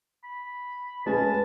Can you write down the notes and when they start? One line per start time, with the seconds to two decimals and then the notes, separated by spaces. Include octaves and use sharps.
0.24 B5
1.06 G#3 C#4 B4 G#5 A5